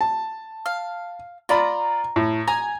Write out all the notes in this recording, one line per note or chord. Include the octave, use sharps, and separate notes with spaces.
A5
F5
F4 D5 A#5 B5
A2
G#5 A#5